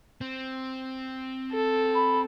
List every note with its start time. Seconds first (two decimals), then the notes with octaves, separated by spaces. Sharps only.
0.21 C4
1.52 A4
1.95 B5